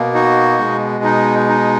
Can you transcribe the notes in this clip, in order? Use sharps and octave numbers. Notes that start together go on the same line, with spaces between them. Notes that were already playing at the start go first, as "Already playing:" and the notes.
Already playing: B2 A#3
D#4 F#4
B2 G#3
D#4
D#4